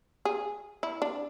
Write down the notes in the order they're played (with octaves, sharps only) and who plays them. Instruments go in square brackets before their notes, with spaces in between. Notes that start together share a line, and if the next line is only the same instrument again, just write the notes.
[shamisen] G#4
E4
D4